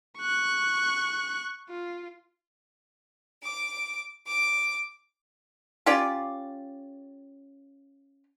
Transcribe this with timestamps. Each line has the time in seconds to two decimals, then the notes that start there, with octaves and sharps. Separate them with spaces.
0.19 C#6 F#6
1.69 F4
3.42 D6
4.25 D6
5.86 C#4 F4 G4 D5